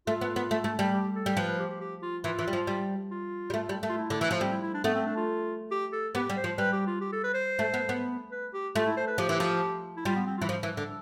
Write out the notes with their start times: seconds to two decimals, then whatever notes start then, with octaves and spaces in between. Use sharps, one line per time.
0.07 A3 F4
0.21 B3
0.36 B3
0.51 A3
0.64 A3
0.79 G3
0.94 G4
1.16 A4
1.26 G3
1.37 F3 B4
1.48 B4
1.59 G4
1.70 G4
1.81 G4
2.03 F4
2.24 E3 F4
2.39 E3
2.47 G3
2.53 F3
2.67 G3
3.11 F4
3.50 G3
3.54 A3
3.69 G3
3.83 A3
3.89 F4
3.98 E4
4.10 D3
4.21 E3
4.31 F3
4.41 G3 C4
4.52 E4
4.62 E4
4.74 D4
4.84 A3 B3
4.95 C4
5.06 D4
5.17 F4
5.71 G4
5.93 A4
6.15 B3 G4
6.30 G3
6.37 C5
6.44 F3
6.58 G3 B4
6.73 G4
6.87 F4
7.01 G4
7.12 A4
7.24 B4
7.34 C5
7.59 A3
7.74 B3
7.89 B3
8.31 B4
8.53 G4
8.75 A3 F4
8.86 E4
8.97 C5
9.07 B4
9.18 F3 G4
9.29 E3
9.40 F3
9.97 E4
10.05 G3 F4
10.16 B3
10.27 C4
10.38 F4
10.42 E3
10.49 F3
10.63 E3
10.77 D3